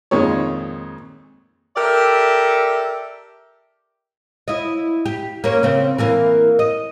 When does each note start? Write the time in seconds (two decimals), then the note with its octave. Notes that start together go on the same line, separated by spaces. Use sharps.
0.11 F2 A#2 D#3 G#3 C#5
1.77 G4 A4 A#4 D5 E5
4.48 E4 D#5
5.06 G4
5.44 A#3 C#4
5.63 C#3 C4
5.98 E3 A#3 A#4
6.59 D#5